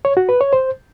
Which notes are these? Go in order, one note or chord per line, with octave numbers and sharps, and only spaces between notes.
C#5
F#4
B4
C#5
C5